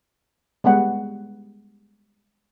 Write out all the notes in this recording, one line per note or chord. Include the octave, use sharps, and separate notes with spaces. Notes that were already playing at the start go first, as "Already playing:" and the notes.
G3 G#3 B3 F#5